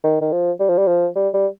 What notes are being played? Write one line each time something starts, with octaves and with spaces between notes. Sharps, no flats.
D#3
D#3
F3
G3
F3
G3
F3
G3
G3